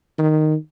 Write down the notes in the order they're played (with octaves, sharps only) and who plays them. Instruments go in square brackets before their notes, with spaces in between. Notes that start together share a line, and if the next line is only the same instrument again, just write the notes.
[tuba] D#3